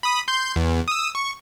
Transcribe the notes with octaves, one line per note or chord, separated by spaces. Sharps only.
B5 D#6
C6 G6
E2
D#6 E6
C#6